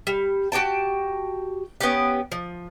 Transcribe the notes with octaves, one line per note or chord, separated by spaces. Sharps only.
G3
F#4 G4 G5 A5
B3 C#4 G4
F3